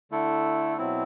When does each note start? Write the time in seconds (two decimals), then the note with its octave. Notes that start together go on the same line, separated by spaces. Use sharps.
0.11 D3 A3 E4 A4
0.78 B2 F#3 C4 E4